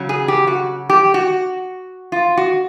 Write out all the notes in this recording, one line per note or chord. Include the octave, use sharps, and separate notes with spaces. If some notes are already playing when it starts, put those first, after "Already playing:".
Already playing: C#3 F#3
G#4
G4
F#4
G4
F#4
F4
F#4